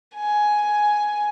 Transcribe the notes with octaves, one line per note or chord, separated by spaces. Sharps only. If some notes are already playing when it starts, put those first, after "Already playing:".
G#5